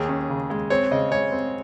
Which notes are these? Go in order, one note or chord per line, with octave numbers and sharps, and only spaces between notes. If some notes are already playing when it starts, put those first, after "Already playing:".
Already playing: D#2 G#4
C#4
C#3
G#3
C4 C#5
C#3 D#5
G#3 C#5
C4